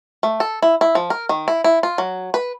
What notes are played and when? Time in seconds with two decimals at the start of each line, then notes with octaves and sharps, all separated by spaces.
0.23 A3
0.40 A4
0.62 E4
0.81 E4
0.95 F3
1.10 A#4
1.29 D#3
1.48 E4
1.64 E4
1.83 F4
1.98 F#3
2.34 B4